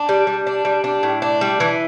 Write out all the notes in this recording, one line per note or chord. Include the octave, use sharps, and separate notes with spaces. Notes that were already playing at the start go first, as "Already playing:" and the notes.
Already playing: D4
G3
G3
D4
G3
D4
A2
D4
G3
E3